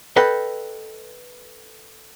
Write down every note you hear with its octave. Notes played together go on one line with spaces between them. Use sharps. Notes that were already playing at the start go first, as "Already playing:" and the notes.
A4 B4 D#5 G5